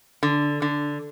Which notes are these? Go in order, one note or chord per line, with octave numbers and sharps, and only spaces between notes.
D3
D3